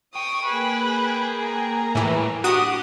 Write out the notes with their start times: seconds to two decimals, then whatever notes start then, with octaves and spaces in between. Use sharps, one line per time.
0.15 C#5 G5 C#6 D#6
0.45 A#3 G#4 B4
1.43 A#5
1.95 D#2 A2 E3 G3
2.44 D4 F#4 G4 D#6